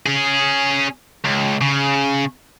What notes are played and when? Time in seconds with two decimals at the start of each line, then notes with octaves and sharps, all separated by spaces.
0.06 C#4 G#4
1.25 C#2
1.61 C#3